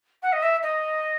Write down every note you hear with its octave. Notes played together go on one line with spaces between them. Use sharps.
F#5
D#5
E5
D#5